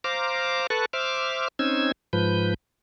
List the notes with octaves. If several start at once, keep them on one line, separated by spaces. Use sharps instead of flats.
C5 F5 A#5 D6
A4 B4 A5 C#6 F#6
C5 E5 D6 F6
C4 C#4 D#4 E6 G#6
G#2 F3 B4 G6